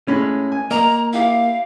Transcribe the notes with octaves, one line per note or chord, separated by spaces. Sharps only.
A2 G#3 C#4 B5
G#5
A#3 D#5 A#5
E4 G4 F5